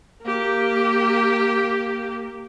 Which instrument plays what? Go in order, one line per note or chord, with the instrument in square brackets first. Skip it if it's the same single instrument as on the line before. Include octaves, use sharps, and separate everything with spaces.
[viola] A#3 G4